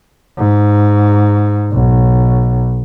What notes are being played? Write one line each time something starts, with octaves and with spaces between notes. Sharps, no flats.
G#2
B1